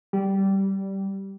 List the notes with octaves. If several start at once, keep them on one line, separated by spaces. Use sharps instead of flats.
G3